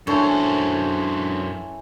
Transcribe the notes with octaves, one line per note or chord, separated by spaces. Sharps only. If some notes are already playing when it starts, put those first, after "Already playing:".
F#2 E3 D4 A4 C5 C#5 A5